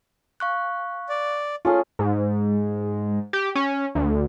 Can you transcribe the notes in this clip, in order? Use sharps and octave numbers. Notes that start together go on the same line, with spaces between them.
F5 C#6 F#6
D5
A3 C#4 F4 G#4
G#2
G4
C#4
D2